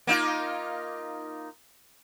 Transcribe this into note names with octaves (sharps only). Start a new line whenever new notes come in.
A#3 D#4 F4